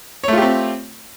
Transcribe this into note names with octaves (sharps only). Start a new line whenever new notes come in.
A3 C4 F4 G4 C#5